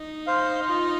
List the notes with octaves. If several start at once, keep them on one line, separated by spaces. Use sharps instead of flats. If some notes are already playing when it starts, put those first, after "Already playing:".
Already playing: D#4
C5 F5
F4